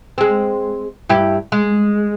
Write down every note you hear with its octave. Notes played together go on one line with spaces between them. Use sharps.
G#3 C4
G2 E4 G4
G#3